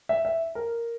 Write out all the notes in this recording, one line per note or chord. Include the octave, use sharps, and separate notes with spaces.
E5
E5
A#4